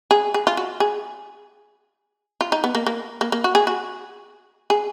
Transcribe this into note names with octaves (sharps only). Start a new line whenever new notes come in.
G#4
G#4
F4
F#4
G#4
F4
D#4
B3
A#3
A#3
A#3
A#3
F#4
G#4
F#4
G#4